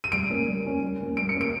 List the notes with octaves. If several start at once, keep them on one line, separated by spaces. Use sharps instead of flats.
D#7
G3 D7
A#3 C#4
G3
A#3 C#4
G3
A#3 C#4
G3 D7
C#7
A#3 C#4
D7